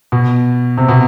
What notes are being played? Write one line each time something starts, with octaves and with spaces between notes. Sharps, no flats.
B2
C3
B2